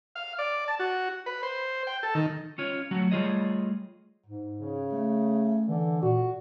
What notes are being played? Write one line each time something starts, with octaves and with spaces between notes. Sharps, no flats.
F5
D5
A5
F#4
B4
C5
G5
A4
D#3
C#4 F4 C#5
F#3 A3 F#4
G3 A3 F4 G#4 C#5 D#5
G#2
C#3
A3
D3 E3
A#2 F#4